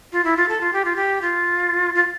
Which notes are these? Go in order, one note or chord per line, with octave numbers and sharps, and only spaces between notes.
F4
E4
F4
A4
F4
G4
F4
G4
F4
F4